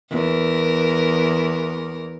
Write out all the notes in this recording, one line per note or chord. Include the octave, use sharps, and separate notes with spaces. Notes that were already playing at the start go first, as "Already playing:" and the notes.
E2 A#4